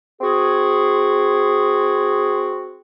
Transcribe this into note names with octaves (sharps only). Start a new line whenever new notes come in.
C4 F#4 G#4